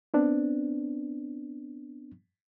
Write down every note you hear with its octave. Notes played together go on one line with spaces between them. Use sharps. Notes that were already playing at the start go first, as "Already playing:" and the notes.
B3 C4 D4